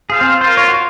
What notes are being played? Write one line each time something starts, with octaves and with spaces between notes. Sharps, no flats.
F4 G#4 C5 F5
C4
F4 A#4 C5 F5
C#5
F#4
F4